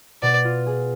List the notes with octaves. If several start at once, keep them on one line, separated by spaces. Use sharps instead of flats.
B2 D5
F4
G#4